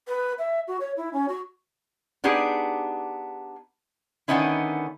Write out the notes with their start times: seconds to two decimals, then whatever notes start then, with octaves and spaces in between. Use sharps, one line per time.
0.08 B4
0.39 E5
0.68 F#4
0.80 C#5
0.97 E4
1.13 C#4
1.28 F#4
2.24 B3 D4 D#4 G4 G#4
4.28 D3 D#3 B3 C#4 D#4 E4